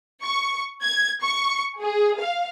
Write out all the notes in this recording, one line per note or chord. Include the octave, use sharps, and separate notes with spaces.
C#6
G#6
C#6
G#4
F5